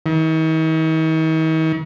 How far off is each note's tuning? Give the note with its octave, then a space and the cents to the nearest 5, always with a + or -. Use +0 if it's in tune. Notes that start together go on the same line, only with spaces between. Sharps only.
D#3 +45